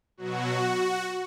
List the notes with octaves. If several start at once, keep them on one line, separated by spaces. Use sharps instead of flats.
B2 F#3 F#4